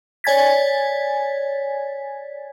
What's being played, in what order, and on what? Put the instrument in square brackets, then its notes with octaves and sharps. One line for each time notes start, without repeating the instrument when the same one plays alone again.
[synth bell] C#5 D5 G#5 G#6 A6 B6